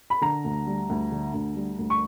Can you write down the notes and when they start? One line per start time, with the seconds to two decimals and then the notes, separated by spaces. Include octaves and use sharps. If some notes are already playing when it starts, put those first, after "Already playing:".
0.10 B5
0.21 D3 A#5
0.44 D2
0.67 G3
0.89 D2
1.12 D3
1.34 D2
1.56 G3
1.78 D2
1.90 C#6